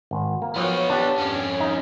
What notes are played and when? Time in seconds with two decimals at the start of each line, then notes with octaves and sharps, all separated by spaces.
0.11 G#1
0.42 A#3
0.56 F3 F#3 B3 C#5
0.90 D4 G4
1.18 F2 C#4
1.60 D#4